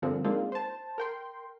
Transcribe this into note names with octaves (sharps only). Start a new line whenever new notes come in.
G2 D3 F3 A#3 C4
G#3 A#3 C4 D4 D#4 F4
C5 A5
A#4 G5 C6